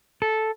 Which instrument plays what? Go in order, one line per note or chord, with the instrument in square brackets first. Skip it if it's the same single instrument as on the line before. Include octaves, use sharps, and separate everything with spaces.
[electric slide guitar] A4